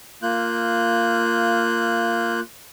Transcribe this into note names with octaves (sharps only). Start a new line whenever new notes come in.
A#3 F4 F#6 G6